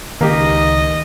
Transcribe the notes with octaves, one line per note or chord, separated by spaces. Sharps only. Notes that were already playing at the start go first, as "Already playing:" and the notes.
C#2 D#3 A#3 G4 D#5